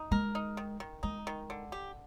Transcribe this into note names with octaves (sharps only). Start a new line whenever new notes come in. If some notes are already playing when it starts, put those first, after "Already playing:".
Already playing: D#4
G#3 A#4
D#4
D#3
D#3
G#3 D#4
D#3
D3
G4